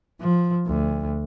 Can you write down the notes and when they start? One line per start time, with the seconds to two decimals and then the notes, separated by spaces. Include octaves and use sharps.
0.21 F3
0.66 D2